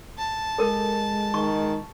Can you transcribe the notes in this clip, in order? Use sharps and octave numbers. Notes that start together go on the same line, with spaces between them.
A5
G#3 A4 A#4
D#3 C#6